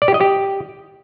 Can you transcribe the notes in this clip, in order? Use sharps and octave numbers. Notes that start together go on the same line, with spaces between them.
D5
G4
D#5
G4